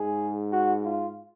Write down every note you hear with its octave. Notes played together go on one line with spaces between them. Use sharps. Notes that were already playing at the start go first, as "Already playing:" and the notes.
Already playing: G#2 G#4
F#4
F4